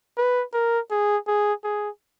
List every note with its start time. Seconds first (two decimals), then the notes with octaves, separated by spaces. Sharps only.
0.18 B4
0.53 A#4
0.91 G#4
1.27 G#4
1.64 G#4